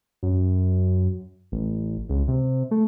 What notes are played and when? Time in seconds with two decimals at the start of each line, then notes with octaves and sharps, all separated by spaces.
0.23 F#2
1.52 A1
2.10 C#2
2.28 C3
2.71 A3